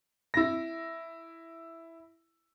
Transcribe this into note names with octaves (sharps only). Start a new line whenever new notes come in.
E4 A#6